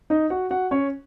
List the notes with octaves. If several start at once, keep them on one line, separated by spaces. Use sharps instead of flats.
D#4 D#5
F#4 F#5
F#4 F#5
C#4 C#5